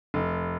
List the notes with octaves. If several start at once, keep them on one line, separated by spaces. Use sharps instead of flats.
F1